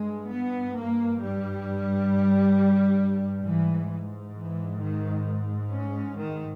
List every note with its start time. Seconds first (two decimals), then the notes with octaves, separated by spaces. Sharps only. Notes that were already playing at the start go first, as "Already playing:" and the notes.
Already playing: G2 G#3
0.29 B3
0.75 A#3
1.19 G3
3.46 G#2 E3
4.35 E3
4.81 D#3
5.71 C#4
6.17 D#3